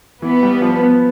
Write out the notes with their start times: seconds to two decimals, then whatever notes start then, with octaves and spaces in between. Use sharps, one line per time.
0.22 E3 B3
0.43 G3
0.62 F3
0.83 B3